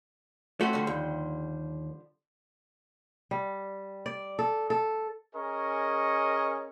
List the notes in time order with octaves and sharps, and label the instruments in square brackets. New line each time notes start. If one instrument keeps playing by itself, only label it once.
[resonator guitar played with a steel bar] E3 C4 C#4 [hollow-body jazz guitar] A3 F#4
[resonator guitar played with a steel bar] D3 F3 G3
[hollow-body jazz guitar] D#2
[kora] G3
D5
A4
A4
[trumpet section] C#4 G#4 A#4 D#5 G#5 C#6